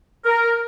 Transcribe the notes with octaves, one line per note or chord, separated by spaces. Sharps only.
A#4